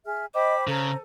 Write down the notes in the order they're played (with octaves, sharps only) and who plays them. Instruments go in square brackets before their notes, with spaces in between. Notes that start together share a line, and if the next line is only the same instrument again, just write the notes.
[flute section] G#4 E5 F6
[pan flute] C5 [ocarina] D#5 [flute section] G5 B5 D6
[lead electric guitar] C#3 [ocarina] A4 [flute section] A#5